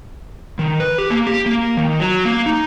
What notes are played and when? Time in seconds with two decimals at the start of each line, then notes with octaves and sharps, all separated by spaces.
0.59 D#3
0.80 B4
0.98 G4
1.10 A#3
1.27 G4
1.46 A#3
1.77 D#3
2.00 F#3
2.25 A#3
2.46 D#4